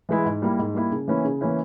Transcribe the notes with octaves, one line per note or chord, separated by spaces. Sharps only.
E3 G#3 E4 G#4
G#2
G3 A#3 E4
G#2
G3 A#3 E4
C#3
E3 A#3 C#4 E4
C#3
E3 A#3 C#4 E4